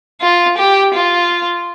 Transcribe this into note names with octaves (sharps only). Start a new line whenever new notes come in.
F4
G4
F4